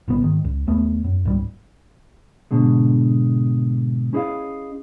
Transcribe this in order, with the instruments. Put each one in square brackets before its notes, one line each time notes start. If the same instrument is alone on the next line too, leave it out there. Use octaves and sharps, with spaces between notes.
[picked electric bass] G1 C#3 B3
G#2 D#3
C#2
D#2 A3 B3
F#2
C#2 G#2 G3
[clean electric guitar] G#2 B2 D3 G#3
C#4 E4 G#4 C5 D#5 F5